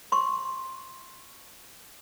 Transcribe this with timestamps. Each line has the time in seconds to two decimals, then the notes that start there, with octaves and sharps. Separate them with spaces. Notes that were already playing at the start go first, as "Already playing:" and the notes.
0.12 C6 C#6